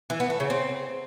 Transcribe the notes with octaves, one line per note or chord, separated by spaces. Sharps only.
E3
B3
A3
C#3
C4